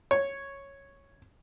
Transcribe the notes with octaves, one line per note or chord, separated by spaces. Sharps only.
C#5